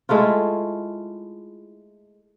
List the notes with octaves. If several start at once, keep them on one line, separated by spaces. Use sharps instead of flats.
G#3 A3 E4 F4